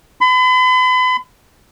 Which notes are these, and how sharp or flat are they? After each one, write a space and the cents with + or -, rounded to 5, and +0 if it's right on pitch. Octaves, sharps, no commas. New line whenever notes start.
B5 +40